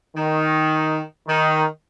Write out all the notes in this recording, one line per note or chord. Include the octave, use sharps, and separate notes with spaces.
D#3
D#3